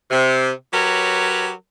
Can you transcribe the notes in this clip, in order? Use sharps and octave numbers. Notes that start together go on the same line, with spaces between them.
C3
F#3 G4 A#4 B4 C#5